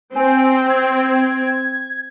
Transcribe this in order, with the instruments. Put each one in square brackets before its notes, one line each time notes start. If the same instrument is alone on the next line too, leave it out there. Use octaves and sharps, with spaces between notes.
[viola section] C4 [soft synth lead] G#5
[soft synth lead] G#6